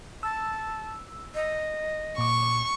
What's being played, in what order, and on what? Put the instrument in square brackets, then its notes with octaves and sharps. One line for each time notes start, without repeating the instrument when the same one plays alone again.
[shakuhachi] A5 [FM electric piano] E6
[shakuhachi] D#5
[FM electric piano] A#2 D6 [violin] C#6